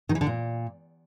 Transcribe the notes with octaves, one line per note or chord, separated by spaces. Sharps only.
D#3
E3
D3
A#2